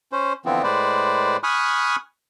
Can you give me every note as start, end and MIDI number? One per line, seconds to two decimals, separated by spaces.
0.12 0.33 61
0.12 0.33 72
0.45 0.62 50
0.45 0.62 52
0.45 0.62 53
0.45 0.62 59
0.45 0.62 60
0.63 1.37 45
0.63 1.37 56
0.63 1.37 71
0.63 1.37 72
0.63 1.37 74
1.43 1.96 80
1.43 1.96 83
1.43 1.96 85
1.43 1.96 87
1.43 1.96 89
1.43 1.96 90